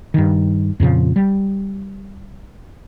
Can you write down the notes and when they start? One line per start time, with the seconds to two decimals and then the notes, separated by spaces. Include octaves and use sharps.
0.14 G2 D#3
0.80 F2 A#2 C#3 F3
1.16 G3